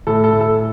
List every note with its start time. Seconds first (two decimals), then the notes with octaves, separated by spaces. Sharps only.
0.07 A2 A4
0.24 A4
0.33 A2
0.41 A4